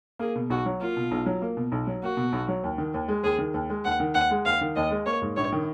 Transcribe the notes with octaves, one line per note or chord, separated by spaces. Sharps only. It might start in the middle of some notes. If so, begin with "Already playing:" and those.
A#3 G#4
B2
B1 F#4
F#3
A#3 F4
B2
B1
F#3
A#3
B2
B1
F#3
A#3 F#4
B2
B1
F#3
D#2
D#3
D#2
G#3
D#2 G#4
D#3
D#2
G#3
D#2 F#5
D#3
D#2 F#5
G#3
D#2 F5
D#3
D#2 D#5
G#3
A#3 C#5
G#2
A#1 C#5
D#3